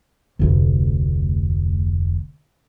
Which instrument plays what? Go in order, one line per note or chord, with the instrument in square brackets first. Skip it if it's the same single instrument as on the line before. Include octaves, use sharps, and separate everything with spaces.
[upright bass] F1 D2